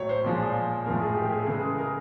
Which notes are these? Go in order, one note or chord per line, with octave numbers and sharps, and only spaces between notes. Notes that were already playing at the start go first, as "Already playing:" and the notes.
Already playing: A2 F#3 C#5
C5
A#2 F3 G#3
A2 F3 G#3 A#4
G#4
G4
G#4
A4
C#3 E3 G#3 G#4
A#4